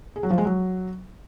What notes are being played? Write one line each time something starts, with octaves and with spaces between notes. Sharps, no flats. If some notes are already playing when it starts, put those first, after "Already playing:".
G#4
F#3
F3
G#3
F#3